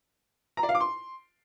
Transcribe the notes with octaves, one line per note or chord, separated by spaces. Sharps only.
A#5
D5
F5
D6
C6